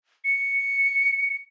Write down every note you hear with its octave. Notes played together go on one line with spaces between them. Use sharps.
C#7